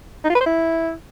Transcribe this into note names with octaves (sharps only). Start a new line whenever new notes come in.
D#4
F4
B4
C5
E4